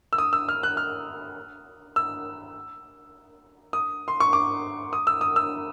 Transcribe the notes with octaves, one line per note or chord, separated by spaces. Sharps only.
E6
D#6
E6
F6
F#6
F6
E6
D#6
C6
C#6
D6
D#6
E6
D#6
E6